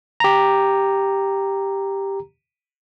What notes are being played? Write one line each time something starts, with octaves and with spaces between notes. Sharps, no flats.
G4 A#5